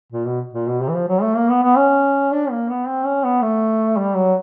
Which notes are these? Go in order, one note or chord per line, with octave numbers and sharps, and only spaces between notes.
A#2
B2
A#2
B2
C3
E3
F3
F#3
A3
A#3
B3
B3
C#4
D4
A#3
B3
C4
C#4
B3
A3
G3
F#3